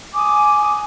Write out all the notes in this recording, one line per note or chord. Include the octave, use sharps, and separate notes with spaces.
G#5 D6 D#6